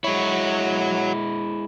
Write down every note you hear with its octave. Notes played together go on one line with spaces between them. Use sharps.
G#3 E4 F#4 C#5